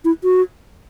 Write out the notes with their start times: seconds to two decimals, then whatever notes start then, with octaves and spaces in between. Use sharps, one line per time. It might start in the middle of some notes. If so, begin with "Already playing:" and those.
0.05 E4
0.24 F#4